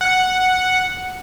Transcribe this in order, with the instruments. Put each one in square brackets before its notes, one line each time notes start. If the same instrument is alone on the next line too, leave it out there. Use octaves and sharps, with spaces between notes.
[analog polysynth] F#5